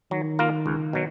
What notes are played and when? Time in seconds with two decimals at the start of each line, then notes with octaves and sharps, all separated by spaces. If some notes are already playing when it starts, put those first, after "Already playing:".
0.11 D#3 F#3
0.39 A#3 F4 A#4
0.66 C#2
0.93 B2 F#3